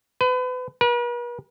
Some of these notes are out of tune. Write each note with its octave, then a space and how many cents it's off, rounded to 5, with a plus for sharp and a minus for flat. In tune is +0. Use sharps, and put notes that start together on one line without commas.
B4 +35
B4 -45